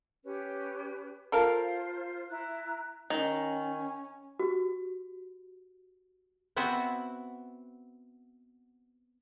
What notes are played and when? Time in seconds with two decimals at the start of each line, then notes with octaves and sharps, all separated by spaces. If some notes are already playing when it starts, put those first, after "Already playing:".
0.24 C#4 G4 B4
1.32 F4 A4 A#4 C5 F5
2.29 E4 A#5 F#6
3.10 D#3 C#4
4.39 F#4 G4
6.56 B3 C4 E4 F#4 F#5